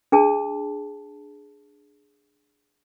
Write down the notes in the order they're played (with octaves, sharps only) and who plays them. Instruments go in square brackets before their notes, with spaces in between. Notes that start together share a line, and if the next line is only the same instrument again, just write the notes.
[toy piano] D4 G#4 A5